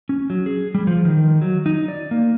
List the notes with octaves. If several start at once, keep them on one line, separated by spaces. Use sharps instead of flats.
C#4
F#3
G#4
G3
F3
D#3
F#3
D#4
D5
A#3